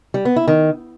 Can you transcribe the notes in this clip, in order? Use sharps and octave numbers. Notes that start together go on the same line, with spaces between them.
G3
B3
E4
D#3